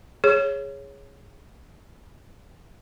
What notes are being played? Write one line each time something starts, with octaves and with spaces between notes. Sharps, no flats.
G#4 C#5